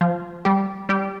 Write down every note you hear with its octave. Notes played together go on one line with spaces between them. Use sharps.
F3 F4
G3 G4
G3 G4